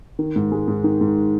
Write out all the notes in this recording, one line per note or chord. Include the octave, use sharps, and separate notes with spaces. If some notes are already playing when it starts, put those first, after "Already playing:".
D#3
G#2
G#3
G#2
D#3
G#2